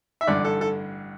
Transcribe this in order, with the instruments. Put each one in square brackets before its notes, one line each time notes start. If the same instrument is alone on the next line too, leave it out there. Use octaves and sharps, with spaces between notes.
[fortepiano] E5
A1 G2 D3 D5
A4
A4